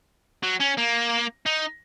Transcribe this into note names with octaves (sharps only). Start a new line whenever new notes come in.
F#3
C#4
A#3
D#4